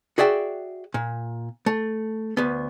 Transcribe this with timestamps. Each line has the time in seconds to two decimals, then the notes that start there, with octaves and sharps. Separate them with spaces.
0.18 F#4 G#4 D5 E5 G5
0.94 A#2
1.66 A3
2.37 D2 B3